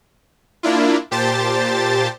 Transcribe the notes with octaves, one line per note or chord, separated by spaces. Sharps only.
A#3 D4 E4 F4
A#2 G4 C5 A5 A6